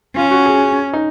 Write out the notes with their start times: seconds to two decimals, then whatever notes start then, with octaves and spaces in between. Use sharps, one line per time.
0.16 C#4 F4
0.31 F#4
0.46 G#4
0.93 D#4